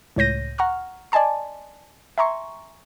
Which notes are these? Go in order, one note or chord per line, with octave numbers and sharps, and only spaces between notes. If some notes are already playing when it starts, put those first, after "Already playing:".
C#2 A2 C#5 G6 A#6 D#7
F#5 A#5 C#6 F6
D5 D#5 G#5 A5 C6
E5 G#5 A#5 C6 C#6